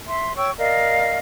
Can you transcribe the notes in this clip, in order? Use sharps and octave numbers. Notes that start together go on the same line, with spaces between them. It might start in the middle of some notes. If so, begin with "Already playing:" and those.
E5 C6
C#5 G5 C#6 E6
A#4 D5 D#5 F5